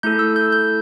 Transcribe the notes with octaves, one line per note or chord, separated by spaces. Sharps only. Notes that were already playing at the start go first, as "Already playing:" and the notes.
A3 E4 A4 G6
E6
G6
G6